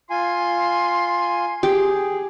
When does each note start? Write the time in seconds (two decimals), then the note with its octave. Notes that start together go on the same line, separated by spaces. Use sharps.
0.10 F4 G#5 C6
1.63 G4 G#4